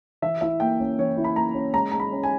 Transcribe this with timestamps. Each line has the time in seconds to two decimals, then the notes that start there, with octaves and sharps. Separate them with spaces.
0.22 E3 E5
0.41 E4 E5
0.60 A#3 G5
0.80 C#4
0.98 E3 C#5
1.17 E4
1.24 B5
1.36 A#3 A#5
1.55 C#4
1.73 G#3 A#5
1.91 G#3 A#5
2.00 B5
2.12 C#4
2.23 G#5